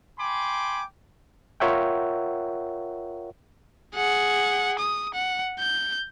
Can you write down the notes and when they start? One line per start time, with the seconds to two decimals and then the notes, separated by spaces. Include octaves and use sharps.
0.19 G5 G#5 B5 C6 D6
1.60 F4 A#4 C#5 E5 F#5 G5
3.95 G#4 F#5
4.79 D#6
5.15 F#5
5.59 G6